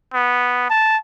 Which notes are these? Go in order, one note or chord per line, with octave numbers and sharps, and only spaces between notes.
B3
A5